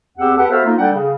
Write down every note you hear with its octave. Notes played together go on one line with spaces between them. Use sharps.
E2 B3 C4 G4 F#5 E6
G4 A4 B4 F#5
B3 F#4 A4 C5 E5 F5
A#3 D#4 F4
G3 D4 A4 F#5 G5
C#3